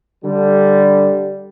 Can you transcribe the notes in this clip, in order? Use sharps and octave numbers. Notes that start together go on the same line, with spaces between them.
D3 G3